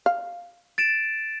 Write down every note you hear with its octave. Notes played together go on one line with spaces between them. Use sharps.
F5
A6 D7 E7